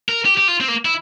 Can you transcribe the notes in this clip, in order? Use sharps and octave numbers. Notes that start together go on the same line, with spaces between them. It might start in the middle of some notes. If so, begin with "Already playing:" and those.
A#4
G4
G4
F4
C4
A#3
E4